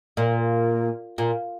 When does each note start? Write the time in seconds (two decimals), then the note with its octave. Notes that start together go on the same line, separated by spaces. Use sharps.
0.17 A#2
1.18 A#2